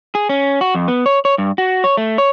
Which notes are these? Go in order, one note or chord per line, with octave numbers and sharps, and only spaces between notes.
G#4
C#4
F#4
F2
B3
C#5
C#5
G2
F#4
C#5
A3
C#5